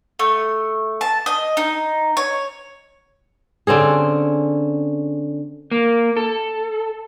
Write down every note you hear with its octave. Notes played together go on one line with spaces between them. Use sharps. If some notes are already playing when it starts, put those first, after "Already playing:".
A3
A5
D#5
D#4
C#5
D3 C4 C#4 G#4
A#3
A4